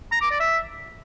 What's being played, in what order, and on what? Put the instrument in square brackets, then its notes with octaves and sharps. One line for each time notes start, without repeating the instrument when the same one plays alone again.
[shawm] A#5
D6
D5
E5